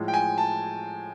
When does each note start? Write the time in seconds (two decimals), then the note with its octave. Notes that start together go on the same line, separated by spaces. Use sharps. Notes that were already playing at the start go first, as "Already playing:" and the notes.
Already playing: A2 F3 G#3
0.08 G5
0.14 G#5
0.38 A5